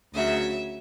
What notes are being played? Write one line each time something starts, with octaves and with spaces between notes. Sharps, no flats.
D2 C#3 F#3 E5